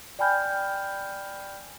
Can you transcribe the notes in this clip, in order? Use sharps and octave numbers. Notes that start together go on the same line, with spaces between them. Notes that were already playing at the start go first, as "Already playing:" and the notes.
D5 G5 G#5 B5 F6 G6